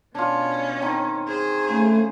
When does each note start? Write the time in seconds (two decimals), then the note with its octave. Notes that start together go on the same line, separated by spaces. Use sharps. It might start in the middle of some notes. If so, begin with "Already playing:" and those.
0.15 B2 C#4 D4 F4
0.81 D#3 C4
1.27 G#4 C5
1.69 C#3 A3